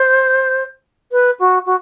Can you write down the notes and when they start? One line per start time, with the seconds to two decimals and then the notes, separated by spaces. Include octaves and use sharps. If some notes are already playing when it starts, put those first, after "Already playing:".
Already playing: C5
1.12 B4
1.40 F#4
1.66 F#4